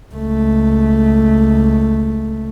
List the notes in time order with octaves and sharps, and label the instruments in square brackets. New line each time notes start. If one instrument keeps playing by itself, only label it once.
[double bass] C#2 A3